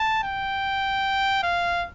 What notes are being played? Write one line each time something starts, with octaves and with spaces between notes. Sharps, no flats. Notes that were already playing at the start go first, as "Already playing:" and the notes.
Already playing: A5
G5
F5